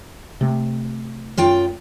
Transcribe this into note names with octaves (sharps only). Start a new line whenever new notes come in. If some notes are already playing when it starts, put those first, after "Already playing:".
C3 A3
F#2 F4 G5